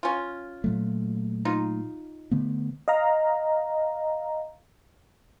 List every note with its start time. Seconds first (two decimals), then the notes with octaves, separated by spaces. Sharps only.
0.03 C#4 F4
0.64 A#2 F#3 A3
1.45 D#4 F4
2.31 D3 A3 B3
2.88 D#5 F5 A#5